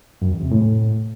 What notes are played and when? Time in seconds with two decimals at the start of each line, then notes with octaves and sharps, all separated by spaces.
0.22 F#2
0.32 E2
0.42 C3
0.51 A2